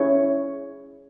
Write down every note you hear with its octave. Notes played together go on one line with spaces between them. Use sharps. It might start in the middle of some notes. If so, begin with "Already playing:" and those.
Already playing: C#4 E4 G#4 C#5